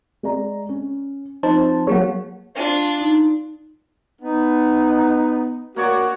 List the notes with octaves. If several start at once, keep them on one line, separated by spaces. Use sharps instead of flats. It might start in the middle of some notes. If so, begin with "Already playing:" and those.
G#3 D5 A#5
C#4
F3 C4 D#4 C5 A5
F#3 A#3 G#4 C#5 F#5
D4 F4
D#4
B3 D#4
A#3 F#4 C#5 D5